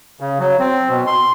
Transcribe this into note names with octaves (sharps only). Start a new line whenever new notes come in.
C#3
F#3
C4
B2
C6